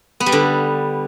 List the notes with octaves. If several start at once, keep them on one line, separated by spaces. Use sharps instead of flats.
B3
G3
D3